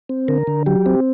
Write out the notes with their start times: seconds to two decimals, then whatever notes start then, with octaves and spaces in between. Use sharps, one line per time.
0.09 C4
0.28 D3 A#4
0.47 D3
0.66 F#3 G4
0.86 C4